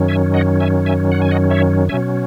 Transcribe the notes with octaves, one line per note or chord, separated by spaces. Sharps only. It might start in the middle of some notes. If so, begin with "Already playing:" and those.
Already playing: F#2 D#3 F#3 C#4
E5 G#5
D#5 F#5
E5 G#5
E5 G#5
F#5
G#5
D#5 F#5
C#5 E5
B2 F#3 C#4 E5 G#5